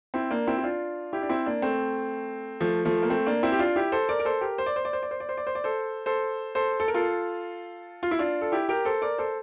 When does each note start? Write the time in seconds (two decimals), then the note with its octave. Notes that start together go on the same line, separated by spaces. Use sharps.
0.14 C4 E4
0.31 A#3 D4
0.47 C4 E4
0.58 E4
0.64 D4 F4
1.13 E4 G4
1.22 D4
1.29 C4 E4
1.46 A#3 D4
1.62 A3 C4
2.60 F3 A3
2.85 F3 A3
3.03 A#3
3.10 A3 C4
3.26 A#3 D4
3.43 C4 E4
3.52 G4
3.59 D4 F4
3.76 E4 G4
3.92 A4 C5
4.09 A#4 D5
4.20 A#4
4.25 A4 C5
4.41 G4 A#4
4.58 C5
4.66 D5
4.76 C5
4.85 D5
4.93 C5
5.03 D5
5.11 C5
5.20 D5
5.29 C5
5.37 D5
5.47 C5
5.55 D5
5.64 A4 C5
6.06 A4 C5
6.55 A4 C5
6.80 A4
6.88 A#4
6.94 F4 A4
8.03 F4
8.11 E4
8.19 D4 F4
8.41 A4
8.52 E4 G4
8.69 G4 A#4
8.85 A4 C5
9.02 A#4 D5
9.18 A4 C5